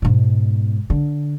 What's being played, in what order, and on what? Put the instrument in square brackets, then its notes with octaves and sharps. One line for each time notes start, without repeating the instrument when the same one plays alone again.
[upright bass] G#2 B2
D3